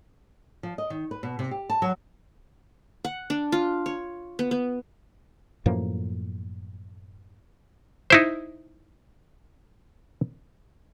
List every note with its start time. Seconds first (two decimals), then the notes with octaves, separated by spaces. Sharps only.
0.63 F3
0.78 D#5
0.90 D#3
1.11 B4
1.23 B2
1.39 C3
1.51 G4
1.70 A5
1.82 F#3
3.04 F#5
3.30 D4
3.52 F4
3.86 C#5
4.39 B3
4.51 B3
5.66 F#2 A2 F3 A#3
8.10 D#4 E4 C5